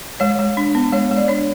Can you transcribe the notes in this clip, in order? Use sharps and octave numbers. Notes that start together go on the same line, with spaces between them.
G#3 C#5
G#3
D4
B3
G#3 C#5
G#3
D5
D4 C#5